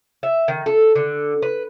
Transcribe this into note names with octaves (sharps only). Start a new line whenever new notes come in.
E5
D#3
A4
D3
B4